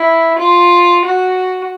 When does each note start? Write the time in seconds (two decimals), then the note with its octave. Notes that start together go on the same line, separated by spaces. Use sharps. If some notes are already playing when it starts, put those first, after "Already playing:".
Already playing: E4
0.37 F4
1.04 F#4